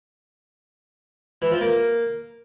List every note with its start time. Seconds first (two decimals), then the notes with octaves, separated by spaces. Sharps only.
1.42 E3
1.51 F3
1.61 A#3